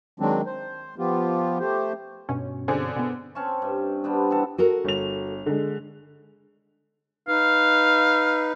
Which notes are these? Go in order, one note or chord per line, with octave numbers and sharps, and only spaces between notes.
D#3 F#3 G#3 C4 D4
C5
F3 B3 F4 G4
A3 G4 C5
G2 B2 C#4
D3 C4 G#4
B2 B3
C4 C#4 A5 C#6
G2
G3 B3 C4 D4
E3 A4 F#5
F#4 A4 A#4
G1 F7
D3 G#3
D#4 B4 F5